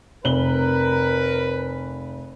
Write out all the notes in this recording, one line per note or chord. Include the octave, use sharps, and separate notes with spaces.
F1 A#4 B4 F#7 G7